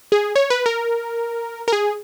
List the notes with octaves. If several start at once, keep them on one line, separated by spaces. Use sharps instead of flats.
G#4
C#5
B4
A#4
A#4
G#4